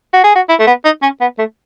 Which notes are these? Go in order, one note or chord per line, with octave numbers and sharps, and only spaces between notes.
F#4
G#4
F#4
E4
A3
B3
D#4
C#4
B3
A3